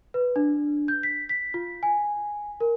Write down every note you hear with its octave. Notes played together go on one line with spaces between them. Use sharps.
B4
D4
G6
B6
B6
F4
G#5
A#4